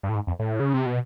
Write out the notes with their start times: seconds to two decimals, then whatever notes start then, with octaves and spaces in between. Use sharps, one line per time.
0.03 G2
0.09 A2
0.15 G#2
0.27 F2
0.39 A2
0.60 C#3
0.74 C3
0.86 B2